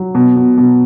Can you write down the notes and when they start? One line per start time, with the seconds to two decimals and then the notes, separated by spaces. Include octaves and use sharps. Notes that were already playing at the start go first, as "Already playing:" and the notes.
Already playing: F#3
0.15 B2
0.36 B2
0.58 B2